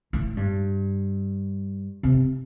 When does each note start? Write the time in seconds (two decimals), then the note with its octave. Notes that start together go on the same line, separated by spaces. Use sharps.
0.13 A2
0.37 G2
2.03 C3